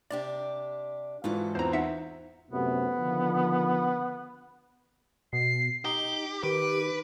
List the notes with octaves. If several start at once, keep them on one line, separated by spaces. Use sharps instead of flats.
C3 D4 G4 D5
G#2 E3 F4 F#4 A4
E2 C4 C5 A#5
D#4 E5 F#5
F#2 A2 C3 B3
D3 D#3 F3
B2 C7
D#4 G4 G7
D#3 G4 B4 D7